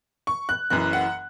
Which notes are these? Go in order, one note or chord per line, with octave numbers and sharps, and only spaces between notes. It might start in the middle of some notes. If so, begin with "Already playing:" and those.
C#6
F#6
F#1 F#2 E3 F#6
F#5